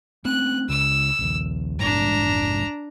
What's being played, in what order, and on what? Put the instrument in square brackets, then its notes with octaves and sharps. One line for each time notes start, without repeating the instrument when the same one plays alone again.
[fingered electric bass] A3 C4 C#4 [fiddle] F#6
[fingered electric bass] C#2 C#3 [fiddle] E6
[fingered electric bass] A#1 D#2
[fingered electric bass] F1 A#1 G#2 [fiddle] D4 A#5